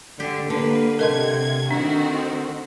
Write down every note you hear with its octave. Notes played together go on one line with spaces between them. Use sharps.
D3 G4
D3 A#3 B4
C3 A3 A#4 D#5 C6 G#6
D#3 C4 D4 F#4